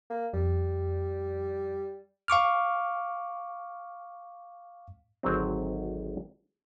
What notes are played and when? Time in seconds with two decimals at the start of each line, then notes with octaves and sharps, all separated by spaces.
0.10 A#3
0.33 F2 G3
2.28 F5 C#6 D6 F6
5.23 G#1 D2 F#3 C4